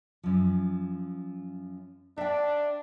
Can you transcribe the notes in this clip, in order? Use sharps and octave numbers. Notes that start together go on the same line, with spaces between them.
F#2 F3
D4 E5 G5